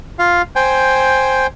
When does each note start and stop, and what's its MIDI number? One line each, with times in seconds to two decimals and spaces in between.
0.19 0.42 65
0.19 0.42 77
0.56 1.47 72
0.56 1.47 79
0.56 1.47 80